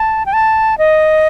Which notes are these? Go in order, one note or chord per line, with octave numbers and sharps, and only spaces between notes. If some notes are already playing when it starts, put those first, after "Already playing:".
Already playing: A5
G5
A5
D#5